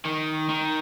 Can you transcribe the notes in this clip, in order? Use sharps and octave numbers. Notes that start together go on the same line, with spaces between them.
D#3
D#3